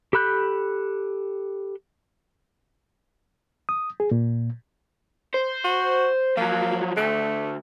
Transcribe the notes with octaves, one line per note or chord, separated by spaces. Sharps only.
G4 A4 B5 F#6 G6
D#6
G#4
A#2
C5
F#4
F3 F#3 A#3
D2 A3